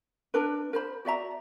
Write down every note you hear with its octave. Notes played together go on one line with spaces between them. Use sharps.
D4 A#4 B4
A#4 C5 B5
F#4 D5 E5 A#5